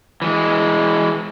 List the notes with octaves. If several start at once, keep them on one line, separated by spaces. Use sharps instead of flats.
E3 G3 G#3